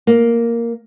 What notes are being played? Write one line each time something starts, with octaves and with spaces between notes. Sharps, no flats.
A#3